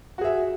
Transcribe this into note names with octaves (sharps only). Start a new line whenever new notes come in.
F#4 G#4 E5